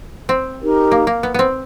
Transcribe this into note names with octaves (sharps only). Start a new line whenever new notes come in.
C4
D#4 G4 A#4
A#3
A#3
B3
B3 C4